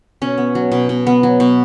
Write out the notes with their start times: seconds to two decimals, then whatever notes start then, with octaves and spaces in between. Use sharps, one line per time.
0.22 B2 C#4
0.38 B3
0.55 F#3
0.72 B2
0.89 B2
1.07 B3
1.23 F#3
1.40 B2